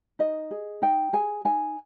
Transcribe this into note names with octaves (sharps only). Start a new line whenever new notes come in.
D#4 D#5
G#4
D#4 G5
G#4 G#5
D#4 G#5